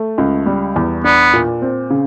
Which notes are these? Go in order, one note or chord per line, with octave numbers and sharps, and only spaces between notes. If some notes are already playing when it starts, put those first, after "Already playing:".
Already playing: A3
C#2
G3
E2
B3 D4
A#2
C4
C#3